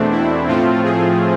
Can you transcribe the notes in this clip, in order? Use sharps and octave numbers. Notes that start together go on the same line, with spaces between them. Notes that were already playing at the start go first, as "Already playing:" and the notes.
Already playing: E2 B2 A3 C4 D4
E4
A2 F3 A3 C4 F4
G#4